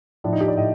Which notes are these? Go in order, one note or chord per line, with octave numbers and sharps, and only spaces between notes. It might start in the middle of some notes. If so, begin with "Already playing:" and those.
A2 F3 D4
D#4
G4
D5
A2 D#5